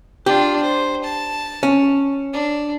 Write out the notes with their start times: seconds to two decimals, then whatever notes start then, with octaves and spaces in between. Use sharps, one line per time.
0.26 D4 F4 G4
0.62 C5
1.04 A5
1.63 C#4
2.33 D4